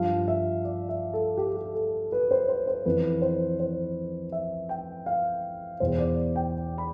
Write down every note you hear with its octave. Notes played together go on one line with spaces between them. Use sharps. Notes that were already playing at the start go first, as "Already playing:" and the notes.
Already playing: G2 F3 F5
E5
D5
E5
A4
G4
A4
G4
A4
B4
C5
C5
C5
F2 E3 B4
C5
C5
E5
G5
F5
E2 B2 C5
D5
G5
B5